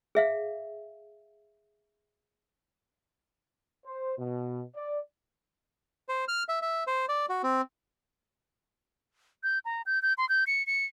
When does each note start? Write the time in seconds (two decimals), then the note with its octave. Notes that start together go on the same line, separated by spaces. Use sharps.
0.15 G#4 E5 F5
3.85 C5
4.18 B2
4.75 D5
6.09 C5
6.28 F6
6.49 E5
6.62 E5
6.87 C5
7.09 D5
7.29 F#4
7.43 C4
9.43 G6
9.65 A#5
9.86 G6
10.02 G6
10.18 C6
10.29 G6
10.47 C#7
10.67 C#7